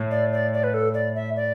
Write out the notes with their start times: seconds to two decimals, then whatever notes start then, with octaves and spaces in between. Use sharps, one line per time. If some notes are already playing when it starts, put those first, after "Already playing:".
Already playing: A2
0.11 D5
0.33 D5
0.54 D5
0.64 B4
0.74 A4
0.94 D5
1.15 E5
1.36 D5